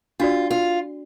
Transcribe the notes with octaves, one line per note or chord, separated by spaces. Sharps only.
D4 F4 F#4 D5
F4